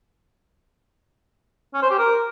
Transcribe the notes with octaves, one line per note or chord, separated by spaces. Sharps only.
C#4
C5
G4
A#4